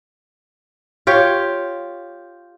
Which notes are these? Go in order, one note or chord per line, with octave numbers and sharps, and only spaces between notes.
F4 G4 C#5